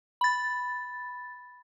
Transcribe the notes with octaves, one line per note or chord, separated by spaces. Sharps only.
B5 A6